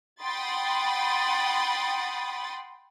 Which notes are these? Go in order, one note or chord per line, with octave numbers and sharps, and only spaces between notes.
F#5 G5 B5 C6 D#6 A6